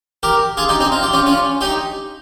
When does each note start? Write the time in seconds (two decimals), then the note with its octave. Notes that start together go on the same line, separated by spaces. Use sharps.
0.23 G4 A#4
0.57 F4 G#4
0.69 D#4 G4
0.80 C4 D#4
0.92 F4
1.03 G4
1.13 C#4 F4
1.26 C#4 F4
1.61 D#4 G4